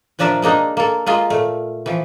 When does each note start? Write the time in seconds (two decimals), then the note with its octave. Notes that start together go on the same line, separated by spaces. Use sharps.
0.19 A#2 F3 D4 A#4 E5 A5
0.42 G#3 A#3 D4 D#4
0.77 A#3 A4
1.06 G#3 A#3 F4 D#5
1.30 A#2 A3
1.86 E3 F3